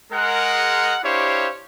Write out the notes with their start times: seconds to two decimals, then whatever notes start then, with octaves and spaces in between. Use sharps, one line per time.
0.13 G#3 A#4 F#5
1.04 D4 E4 G4 C5 C#5 F5